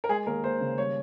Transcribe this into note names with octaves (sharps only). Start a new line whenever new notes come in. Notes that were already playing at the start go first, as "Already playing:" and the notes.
A#4
G#3 G#4
D#2 A#4
D#2 C5
C#3
G3 C#5